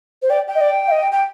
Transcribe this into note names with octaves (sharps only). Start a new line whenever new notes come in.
C5
D5 G5
G5
D#5
D5
F5
D#5
G5